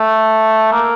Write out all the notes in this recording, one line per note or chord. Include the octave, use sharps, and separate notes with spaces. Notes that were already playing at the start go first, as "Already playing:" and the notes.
Already playing: A3
A#3